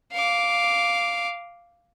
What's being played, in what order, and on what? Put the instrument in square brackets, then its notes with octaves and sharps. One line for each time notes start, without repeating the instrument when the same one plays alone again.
[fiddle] F5 D6